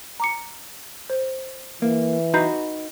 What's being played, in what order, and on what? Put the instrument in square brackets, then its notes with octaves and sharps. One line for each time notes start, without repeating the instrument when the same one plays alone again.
[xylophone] A#5 D6 C#7
C5
[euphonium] E3 [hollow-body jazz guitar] A#3
[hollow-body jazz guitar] D#4 F#4 B4 [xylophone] A#5 G6 C7